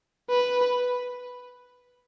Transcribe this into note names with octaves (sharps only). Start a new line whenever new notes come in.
B4